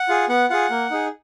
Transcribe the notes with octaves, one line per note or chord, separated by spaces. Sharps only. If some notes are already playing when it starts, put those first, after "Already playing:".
Already playing: F#5
F4 G#4
B3 F#5
F4 G#4 F#5
A#3
D#4 G#4